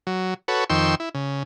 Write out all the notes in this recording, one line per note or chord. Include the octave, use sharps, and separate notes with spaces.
F#3
F#4 A4 B4 C#5
F2 D#3 G5 C6 C#6 E6
E4
C#3